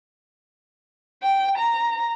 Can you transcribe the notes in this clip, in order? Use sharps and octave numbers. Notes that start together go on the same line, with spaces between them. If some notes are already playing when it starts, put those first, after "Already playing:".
G5
A#5